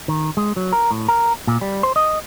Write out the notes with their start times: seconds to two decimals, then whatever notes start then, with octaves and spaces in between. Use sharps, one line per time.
0.08 D#3
0.37 G#3
0.56 F#3
0.72 A#4
0.91 A2
1.08 A#4
1.47 A#2
1.61 G3
1.83 C5
1.96 D#5